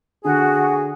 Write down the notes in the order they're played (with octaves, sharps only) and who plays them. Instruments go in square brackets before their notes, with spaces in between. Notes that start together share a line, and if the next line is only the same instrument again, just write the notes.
[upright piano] D3 [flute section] F#4 [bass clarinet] G#4